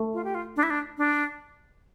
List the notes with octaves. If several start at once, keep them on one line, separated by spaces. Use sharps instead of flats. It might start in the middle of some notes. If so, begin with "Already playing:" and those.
Already playing: A3
F4
G4
F4
D4
E4
D4
D4